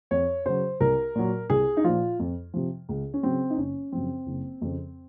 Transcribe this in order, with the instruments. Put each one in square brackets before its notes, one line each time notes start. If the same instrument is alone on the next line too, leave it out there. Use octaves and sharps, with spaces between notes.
[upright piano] F2 C#5
C#3 F#3 C5
C2 A#4
A#2 F#3
C2 G#4
D#4
A#2 F3 F4
F2
C3 F3
C#2
C#4
C#3 F#3 C4
D#4
F#1 C#4
F#2 C#3 F3 C4
F#1
F2 C#3 F3